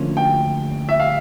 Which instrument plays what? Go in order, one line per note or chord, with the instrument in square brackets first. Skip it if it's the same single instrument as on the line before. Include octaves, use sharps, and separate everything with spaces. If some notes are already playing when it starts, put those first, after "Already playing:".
Already playing: [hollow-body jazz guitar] D2 D3 F3 A#3 C#4
[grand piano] G5
E5
F5